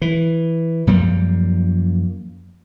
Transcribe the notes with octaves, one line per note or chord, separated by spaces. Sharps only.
E3
F#2 F3 G3 A#3